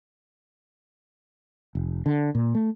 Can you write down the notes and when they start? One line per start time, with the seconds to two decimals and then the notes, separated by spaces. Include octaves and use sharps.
1.75 F1
2.06 D3
2.35 A#2
2.55 A3